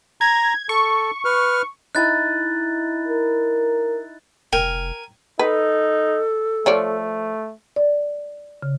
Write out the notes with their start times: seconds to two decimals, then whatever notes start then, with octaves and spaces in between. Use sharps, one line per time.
0.21 A#5 G#6
0.69 A4 C#6
1.25 B4 F6
1.95 D#4 E4 G#5 F#6 A6
3.08 A#4
4.53 F1 A#4 G5 G#5
5.39 D#4 A4 B4
6.66 F3 A3 C#5 D5
7.76 D5
8.63 C#3